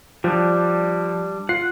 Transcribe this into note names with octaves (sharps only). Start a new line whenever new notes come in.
F3 G3 D4
F4 F#5 C7